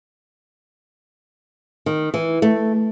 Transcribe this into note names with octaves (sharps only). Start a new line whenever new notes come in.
D#3
E3
A3